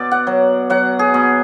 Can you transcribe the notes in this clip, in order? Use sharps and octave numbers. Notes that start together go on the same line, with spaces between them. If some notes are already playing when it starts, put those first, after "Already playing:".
Already playing: B2 D5
F#5
F#3
F#3 F#5
G#4
B2